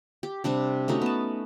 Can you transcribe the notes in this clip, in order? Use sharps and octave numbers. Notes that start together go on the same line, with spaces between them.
G4
C3 G3 D4 G4
A3 C#4 D#4 F#4
B3 A5